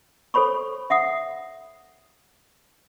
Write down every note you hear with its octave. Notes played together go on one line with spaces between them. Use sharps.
A4 C5 C#5 B5 C#6
E5 F#5 D#6